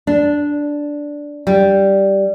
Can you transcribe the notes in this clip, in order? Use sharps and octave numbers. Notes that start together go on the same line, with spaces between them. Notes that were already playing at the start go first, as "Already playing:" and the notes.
D4
G3